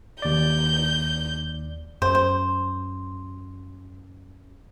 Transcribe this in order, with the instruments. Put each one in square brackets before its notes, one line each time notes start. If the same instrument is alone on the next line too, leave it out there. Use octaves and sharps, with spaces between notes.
[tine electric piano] D#2 D5 [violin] G6
[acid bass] F#2 [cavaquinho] C5
[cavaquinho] C5